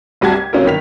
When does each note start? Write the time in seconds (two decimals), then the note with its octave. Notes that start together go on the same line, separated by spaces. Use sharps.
0.21 F#1 C2 G3 F#4 A5 G#6
0.33 G4
0.53 C3 F#3 A#3 C#4 F4 A#4
0.65 G1 D#3 B6 F7